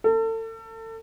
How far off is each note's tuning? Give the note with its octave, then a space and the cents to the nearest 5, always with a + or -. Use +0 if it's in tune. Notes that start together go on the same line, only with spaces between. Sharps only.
A4 +35